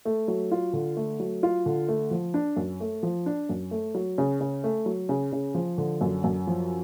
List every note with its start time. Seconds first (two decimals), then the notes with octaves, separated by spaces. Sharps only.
0.05 A3
0.28 F#3
0.51 F4
0.73 D3
0.97 A3
1.20 F#3
1.43 F4
1.66 D3
1.88 A3
2.11 F3
2.34 D4
2.57 F#2
2.80 A3
3.03 F3
3.26 D4
3.49 F#2
3.71 A3
3.95 F#3
4.18 C#3
4.41 C#3
4.64 A3
4.86 F#3
5.09 C#3
5.32 C#3
5.54 F3
5.78 D3
6.01 F#2
6.24 F#2
6.47 F3